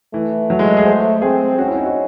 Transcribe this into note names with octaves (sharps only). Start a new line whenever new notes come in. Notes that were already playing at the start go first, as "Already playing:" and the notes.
E3 A3
F#3
G#3
F#4
G#4
C5
C4 G#4
C#4 F#4
E4
D#4
F#4